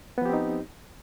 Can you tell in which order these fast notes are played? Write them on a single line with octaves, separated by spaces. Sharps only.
B3 F3 G4 C4 D#4